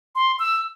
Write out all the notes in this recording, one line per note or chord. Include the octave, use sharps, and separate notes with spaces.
C6
E6